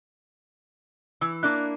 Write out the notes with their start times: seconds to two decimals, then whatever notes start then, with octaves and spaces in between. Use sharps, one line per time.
1.21 E3 E6
1.43 A#3 D4 E4 F#6